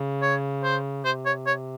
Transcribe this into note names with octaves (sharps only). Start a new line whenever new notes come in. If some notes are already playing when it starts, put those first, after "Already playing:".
Already playing: C#3
C#5
C5
C3 C5
C#5
C#5